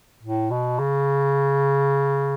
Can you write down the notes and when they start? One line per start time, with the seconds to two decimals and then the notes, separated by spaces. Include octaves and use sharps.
0.23 A2
0.51 B2
0.79 C#3